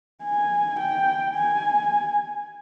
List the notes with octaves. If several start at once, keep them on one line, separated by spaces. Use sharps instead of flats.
G#5
G5
G#5